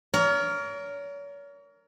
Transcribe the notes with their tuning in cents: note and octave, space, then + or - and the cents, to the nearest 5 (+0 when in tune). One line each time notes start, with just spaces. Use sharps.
A#4 +0 C#5 +40